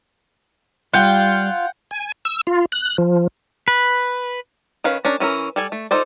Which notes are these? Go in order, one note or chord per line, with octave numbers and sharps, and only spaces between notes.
G3 F4 F#5 G5
G#5
E6
F4
F#6
F3
B4
D#3 C#4 B4 F5
C#4 D4 A#4
E3 C#4 E4 A#4
G3 A4 G#5
A3
D#4 F4 A4 C5 D5